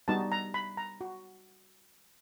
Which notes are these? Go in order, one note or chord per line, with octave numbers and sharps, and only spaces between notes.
G3 B3 D#4 F#4 A5
A#5
B5
A#5
F#4